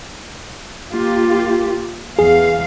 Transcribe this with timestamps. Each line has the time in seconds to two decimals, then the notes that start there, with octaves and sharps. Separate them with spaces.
0.92 A#3 F4 G4
2.19 E2 G#4 F5